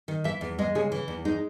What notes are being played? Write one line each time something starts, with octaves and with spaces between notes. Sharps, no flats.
D#3
E3 E5
E2
G#3 D#5
C#3 G#4
E3
E2
G#3 D#4